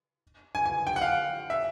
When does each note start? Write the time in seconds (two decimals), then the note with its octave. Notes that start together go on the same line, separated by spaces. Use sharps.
0.55 G#5
0.66 G#5
0.87 G5
0.96 F#5
1.01 F5
1.50 E5